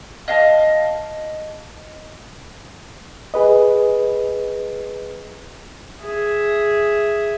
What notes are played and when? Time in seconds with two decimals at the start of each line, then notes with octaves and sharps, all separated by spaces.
0.28 D#5 F5 A5
3.34 G#4 B4 D#5
6.01 G#4 E5